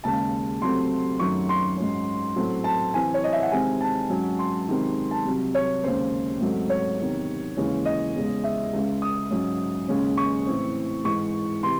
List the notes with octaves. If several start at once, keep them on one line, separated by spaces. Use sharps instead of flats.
D#2 C#3 G#3 A5
C2 C3 F#3 A3 C4 C6
F#2 D#3 F#3 A3 C#6
C6
G#2 F#3 C#4
A2 F#3 A3 C4
A5
C3 E3 C4 G#5
C#5
D#5
E5
F#5
C3 D#3 G#3 C4 G#5
A5
G#2 F#3 C#4
C6
C3 D#3 G#3 C4
A5
C2 C3 F#3
C#5
D#2 C#3 G#3 C#4 C5
G#2 F#3 A3 C4
C#5
E2 C3 D#3
D#2 C#3 E3 G#3 C#4
D#5
E2 C#3 G#3
E5
C#2 C#3 G#3
D#6
G#2 F#3 C#4
D#2 C#3 G#3 C#4
C#6
A2 E3 C4
G#2 E3 G#3 C#6
C3 E3 C6